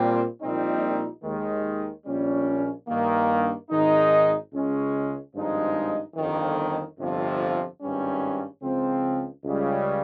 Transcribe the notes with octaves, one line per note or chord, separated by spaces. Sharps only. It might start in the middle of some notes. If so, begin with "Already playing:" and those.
Already playing: A#2 G3 C4
A#1 A#2 G3 C4 D#4
D#2 D#3 G#3
A#1 A#2 G3 C#4
G2 D#3 A#3
G#1 G#2 D#3 G#3 D#4
C#2 C#3 G#3 C#4
G#1 G2 F3 G#3 D#4
G1 F2 D#3
G1 F2 C3 F3
G#1 G2 G3 C#4
C#2 C#3 F3 C4
C#2 C#3 G3